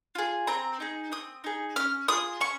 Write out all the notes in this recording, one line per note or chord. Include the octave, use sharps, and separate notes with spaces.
F4 G#4
C4 A#5
D#4 G#4
C4 D#6
D#4 G#4
C#4 F6
F4 G#4 D#6
C#4 C#6